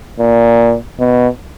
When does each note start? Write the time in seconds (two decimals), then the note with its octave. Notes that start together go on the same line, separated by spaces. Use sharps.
0.19 A#2
0.99 B2